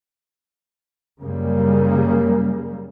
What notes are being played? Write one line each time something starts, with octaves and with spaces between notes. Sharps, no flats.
F#2 C#3 G3 A#3